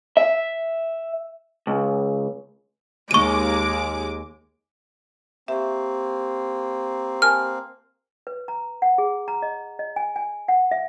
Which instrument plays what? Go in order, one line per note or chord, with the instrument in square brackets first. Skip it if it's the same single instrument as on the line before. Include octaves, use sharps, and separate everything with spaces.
[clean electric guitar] E5
C#2
[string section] D#2 G#3 D6 [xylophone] C#6 D#7
[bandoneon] A#3 C4 [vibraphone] G4 C#6 [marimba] E5
[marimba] A#4 G#5 A5 [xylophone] F6
[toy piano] B4
A#5
F#5
G#4
A#5
D#5
D#5
G#5
G#5
F#5
E5